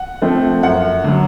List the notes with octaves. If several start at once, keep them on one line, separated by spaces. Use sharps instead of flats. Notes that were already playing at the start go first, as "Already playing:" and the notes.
Already playing: F#5
F3 A3 C4
F#2 F#5
D3 F#3